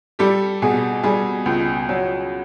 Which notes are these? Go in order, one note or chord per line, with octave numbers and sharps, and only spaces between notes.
G3 G4 A4
B2 G#4
G3 G#4
C#2
F#3